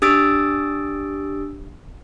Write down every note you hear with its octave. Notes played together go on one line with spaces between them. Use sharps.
D4 G4 D#6 E6 A6 D7